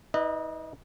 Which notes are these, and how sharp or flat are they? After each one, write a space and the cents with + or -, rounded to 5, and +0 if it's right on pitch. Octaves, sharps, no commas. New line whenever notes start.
D#4 +40 B4 +0 D#5 -30